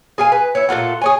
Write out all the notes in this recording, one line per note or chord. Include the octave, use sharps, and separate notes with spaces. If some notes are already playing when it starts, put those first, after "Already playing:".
G#4 F5 G#5
B4
E4 C#5
A#2 A3 F4 F#5
G#4 C#5 G#5